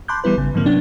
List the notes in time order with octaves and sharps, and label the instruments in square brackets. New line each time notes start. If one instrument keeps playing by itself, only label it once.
[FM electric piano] A5 B5 C6 D6 F#6 G6
E3 G3 B3 E4 B4
G#1 C#3
G#2 D3 E3 F3 A#3 C4
C3 F#3 B3 C#4 D4